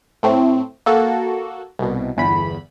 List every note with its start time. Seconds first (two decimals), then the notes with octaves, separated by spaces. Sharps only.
0.23 A2 A3 C4
0.86 A#3 F#4 A4
1.79 C2 B2
2.17 G1 E2 B5